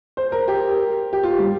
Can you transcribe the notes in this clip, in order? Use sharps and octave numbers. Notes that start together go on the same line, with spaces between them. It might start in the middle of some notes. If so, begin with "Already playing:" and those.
C5
A#4
G4
G4
F4
G3